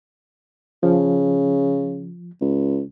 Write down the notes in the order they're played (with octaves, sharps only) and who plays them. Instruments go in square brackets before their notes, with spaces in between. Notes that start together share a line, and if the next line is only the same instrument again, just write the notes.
[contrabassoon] C#3 [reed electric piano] F3
[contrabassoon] C#2